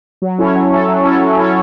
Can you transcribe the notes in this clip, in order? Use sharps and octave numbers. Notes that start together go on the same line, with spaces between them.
F#3
C#4 E4 A4 C#5
F#3
C#4 E4 A4 C#5
F#3
C#4 E4 A4 C#5
F#3
C#4 E4 A4 C#5